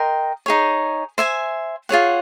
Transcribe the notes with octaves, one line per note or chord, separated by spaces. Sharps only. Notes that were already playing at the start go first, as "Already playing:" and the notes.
Already playing: A#4 D#5 G5 C6
D#4 G#4 C#5
C5 E5 G#5
F4 G#4 C#5 F#5